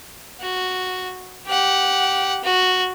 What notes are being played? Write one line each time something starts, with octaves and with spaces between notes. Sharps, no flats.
F#4
G4 F#5
F#4